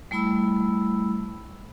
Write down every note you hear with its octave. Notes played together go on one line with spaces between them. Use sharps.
G3 A3 E4 B5 E6